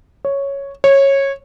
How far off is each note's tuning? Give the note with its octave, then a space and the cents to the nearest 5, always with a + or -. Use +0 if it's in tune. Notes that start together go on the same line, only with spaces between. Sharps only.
C#5 +0
C#5 -15